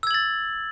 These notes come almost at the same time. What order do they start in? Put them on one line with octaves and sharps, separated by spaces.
E6 G#6 F#7 A6